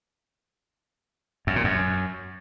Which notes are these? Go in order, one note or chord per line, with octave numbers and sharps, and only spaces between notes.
F#2
A#2
F#2